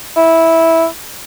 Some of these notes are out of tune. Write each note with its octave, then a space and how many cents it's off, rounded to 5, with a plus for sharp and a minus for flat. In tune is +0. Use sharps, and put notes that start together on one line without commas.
E4 -10